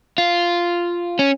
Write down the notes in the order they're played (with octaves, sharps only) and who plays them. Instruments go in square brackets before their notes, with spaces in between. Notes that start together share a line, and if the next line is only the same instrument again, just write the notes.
[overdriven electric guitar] F4
C#4